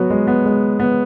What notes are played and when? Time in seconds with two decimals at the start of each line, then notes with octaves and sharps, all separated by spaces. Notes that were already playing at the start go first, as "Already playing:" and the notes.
Already playing: F#3 B3 F#4
0.10 G#3
0.27 B3
0.45 G#3
0.80 B3